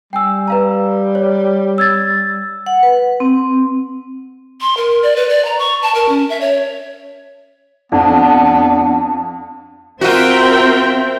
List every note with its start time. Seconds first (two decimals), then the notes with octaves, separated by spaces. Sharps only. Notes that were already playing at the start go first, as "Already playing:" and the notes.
0.13 G3 G5 G#5 E6
0.48 B4 F5 A#5
1.15 C#5
1.78 E6 G#6 A6
2.66 F#5
2.83 B4
3.20 C4
4.61 C6
4.77 A#4
5.03 D5
5.16 B4
5.29 D5
5.45 A#5
5.59 C#6
5.82 A5
5.95 A#4
6.09 C#4
6.30 E5
6.41 C#5
7.92 F2 B3 D4
10.01 C4 F4 F#4 A#4 E5 G5